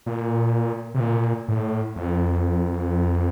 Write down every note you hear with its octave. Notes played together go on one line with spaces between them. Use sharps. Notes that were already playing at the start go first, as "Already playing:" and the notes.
A#2
C3
A#2
A2
F2